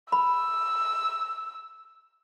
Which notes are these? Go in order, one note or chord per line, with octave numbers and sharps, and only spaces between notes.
B5 E6